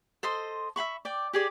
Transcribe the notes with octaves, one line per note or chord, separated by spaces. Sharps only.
A4 C5 D#5 C6
E5 F5 B5 C#6
D5 G5
G4 G#4 D5